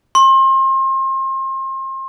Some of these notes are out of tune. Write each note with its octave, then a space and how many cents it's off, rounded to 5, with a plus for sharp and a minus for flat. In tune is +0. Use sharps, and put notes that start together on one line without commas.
C6 +35